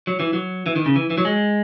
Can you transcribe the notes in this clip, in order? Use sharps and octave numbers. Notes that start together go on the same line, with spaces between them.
F#3
E3
F#3
E3
D#3
C#3
E3
E3
F#3
G#3